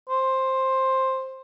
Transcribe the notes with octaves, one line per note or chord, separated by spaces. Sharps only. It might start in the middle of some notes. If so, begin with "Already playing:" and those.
C5